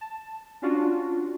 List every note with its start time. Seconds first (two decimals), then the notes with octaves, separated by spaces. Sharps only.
0.01 A5
0.62 C#4 D4 F4 F#4